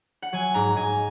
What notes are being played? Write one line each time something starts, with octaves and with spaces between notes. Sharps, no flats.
F#5
F#3 G#5
G#2 A#5
G#2 G#5